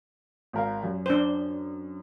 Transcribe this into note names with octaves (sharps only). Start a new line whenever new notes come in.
G#1 A#4 F5
F#2
D4 C5